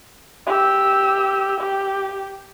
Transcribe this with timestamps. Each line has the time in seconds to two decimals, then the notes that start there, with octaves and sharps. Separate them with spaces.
0.47 G4 E6
1.60 G4